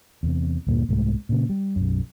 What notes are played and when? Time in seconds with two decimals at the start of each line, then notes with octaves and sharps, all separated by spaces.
0.23 E2 C3
0.67 D2 G2 A#2
0.89 C2 G#2 E3 A3
1.29 A#2 C#3
1.50 G3
1.76 B1 F#2